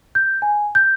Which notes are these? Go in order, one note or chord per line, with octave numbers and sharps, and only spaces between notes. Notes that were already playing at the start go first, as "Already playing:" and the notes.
G6
G#5
G6